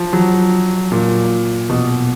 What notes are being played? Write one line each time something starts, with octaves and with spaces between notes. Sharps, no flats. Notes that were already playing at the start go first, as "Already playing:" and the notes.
Already playing: F3
F#3
A#2
B2